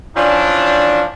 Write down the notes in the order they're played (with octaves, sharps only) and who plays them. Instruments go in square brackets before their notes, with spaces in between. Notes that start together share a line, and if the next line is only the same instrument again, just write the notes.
[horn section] E3 F3 C#4 D4